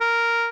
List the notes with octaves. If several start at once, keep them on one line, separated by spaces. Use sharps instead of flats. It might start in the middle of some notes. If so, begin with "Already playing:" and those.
A#4